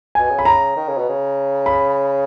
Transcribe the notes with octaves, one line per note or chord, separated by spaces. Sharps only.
B2 G#5
C#3
B5
A#5
D#3
C#3
B2
C#3
B5